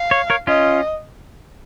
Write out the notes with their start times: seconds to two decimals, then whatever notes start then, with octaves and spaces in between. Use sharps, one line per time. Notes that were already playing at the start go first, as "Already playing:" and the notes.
Already playing: F5
0.11 C#5
0.30 A#4 C#5
0.47 C#4 F4 D#5